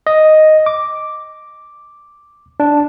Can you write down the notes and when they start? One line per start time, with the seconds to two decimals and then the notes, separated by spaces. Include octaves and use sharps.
0.07 D#5
0.66 D6
2.60 D4